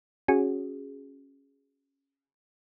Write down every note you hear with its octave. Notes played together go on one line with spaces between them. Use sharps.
C#4 F#4 G#4